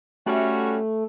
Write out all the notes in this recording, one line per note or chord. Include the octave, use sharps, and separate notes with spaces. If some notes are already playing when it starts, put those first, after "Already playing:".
G3 A3 C#4 F#4